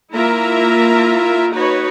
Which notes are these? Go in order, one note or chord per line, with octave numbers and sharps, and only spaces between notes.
A#3 E4 F4 A#4 E5 A#5
D#4 F#4 B4 C#5